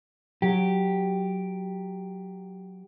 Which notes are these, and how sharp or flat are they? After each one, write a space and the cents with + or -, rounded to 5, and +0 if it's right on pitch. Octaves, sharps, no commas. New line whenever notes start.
F#3 +0 G4 +0